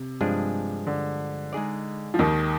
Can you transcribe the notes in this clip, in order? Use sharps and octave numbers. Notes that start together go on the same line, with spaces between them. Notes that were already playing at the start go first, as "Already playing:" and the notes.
Already playing: C3
G2 F3 G#3 D4 G#4
D3
G#3 D#4 G#4 D5
F3
D#2 D#3